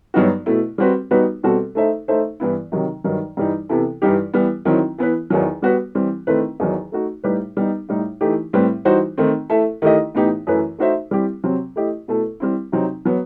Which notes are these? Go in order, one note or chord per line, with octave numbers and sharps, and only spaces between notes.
G2 F#3 B3 D#4 F#4
B2 A3 E4
G3 C4 F#4 B4
G3 B3 D#4 F#4 B4
B2 G3 C4 F#4 A4
A3 D#4 A4 C5 E5
A3 D#4 A4 C5 E5
G2 E3 B3 E4
C3 D#3 F#3
G2 D#3 F#3
G2 E3 G3 D#4
C3 E3 B3 E4 A4
G2 E3 G3 D#4 G4
E3 G3 B3
D#3 F#3 C4 E4
E3 B3 E4 B4
E2 D#3 F#3
G3 B3 F#4 B4
E3 G3 C4
D#3 A3 C4 E4 B4
E2 D#3 F#3
A3 D#4 F#4
A2 G3 D#4 G4 B4
G3 B3 D#4
A2 G3 D#4
E3 A3 D#4 G4
A2 G3 C4 E4 B4
E3 G3 D#4 F#4 C5
D#3 A3 C4
A3 E4 A4 E5
D#3 A3 E4 G4 D#5
A2 E3 B3 D#4 G4
F#2 E3 A3 E4 B4
A3 D#4 F#4 C5 E5
G3 C4 E4 G4
C3 F#3 C4
A3 E4 G4 D#5
B2 A3 E4 A4
G3 C4 E4
C3 F#3 C4 D#4
F#3 B3